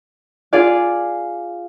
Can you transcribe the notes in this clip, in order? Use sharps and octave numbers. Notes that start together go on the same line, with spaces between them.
F4 G#4 D5 F5